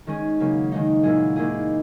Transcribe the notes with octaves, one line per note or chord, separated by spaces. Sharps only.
D#3 G#3 C#4 G#4
C#3 F#3 A#3 C#4
D#3 G#3 D#4
A#2 F#3 A#3 E4 G#4
D#3 A#3 E4 G#4